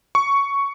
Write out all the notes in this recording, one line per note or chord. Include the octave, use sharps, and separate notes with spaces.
C#6